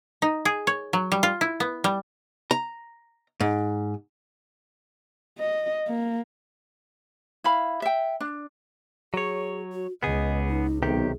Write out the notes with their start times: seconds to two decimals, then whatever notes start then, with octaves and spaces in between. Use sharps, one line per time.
0.22 D#4
0.45 G#4
0.67 C#5
0.93 F#3
1.12 G3
1.23 F4
1.41 E4
1.60 B3
1.84 G3
2.51 A#5
3.40 G#2
5.39 D#5
5.88 A#3
7.44 E4 F5 B5
7.82 E5 G5
8.20 D4
9.14 F#3 G#4 C#5
9.73 F#4
10.03 C#2 B3 G#4 D#5
10.49 D#4
10.83 B1 C3 D#3 G4 G#4